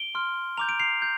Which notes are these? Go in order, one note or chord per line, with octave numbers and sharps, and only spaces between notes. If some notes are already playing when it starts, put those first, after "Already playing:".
Already playing: D7 G7
C6 F6
A#5 D6 G6 F7
D7
C7 F7
G6